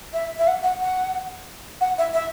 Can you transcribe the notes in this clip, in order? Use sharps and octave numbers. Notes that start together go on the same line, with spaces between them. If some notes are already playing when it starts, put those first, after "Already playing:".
E5
E5
F#5
F#5
F#5
F#5
E5
E5